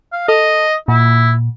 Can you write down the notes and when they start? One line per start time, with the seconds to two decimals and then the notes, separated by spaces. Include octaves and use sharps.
0.13 F5
0.28 A4 D#5
0.88 A#2 E4